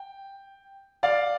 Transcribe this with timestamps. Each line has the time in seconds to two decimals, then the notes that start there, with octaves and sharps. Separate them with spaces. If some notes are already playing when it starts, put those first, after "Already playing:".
Already playing: G5
1.03 D5 F5